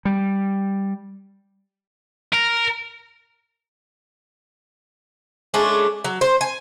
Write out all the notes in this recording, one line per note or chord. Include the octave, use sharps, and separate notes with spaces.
G3
A#4
G#3 A3 C#4 D4
F#3
C5
G#5